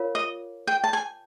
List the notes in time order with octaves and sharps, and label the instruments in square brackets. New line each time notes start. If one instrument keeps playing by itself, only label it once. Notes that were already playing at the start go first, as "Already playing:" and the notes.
Already playing: [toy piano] F4 A#4 C#5 F5
[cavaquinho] D#5
G5
A5
G#5